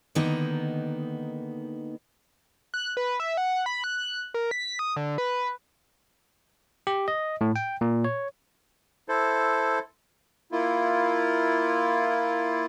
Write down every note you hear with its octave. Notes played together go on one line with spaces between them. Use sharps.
D3 D#3 A#3 B3 D#4
F#6
B4
E5
F#5
B5
F#6
A#4
B6
D#6
D3
B4
G4
D#5
A2
G5
A#2
C#5
E4 A4 C5
A#3 E4 F4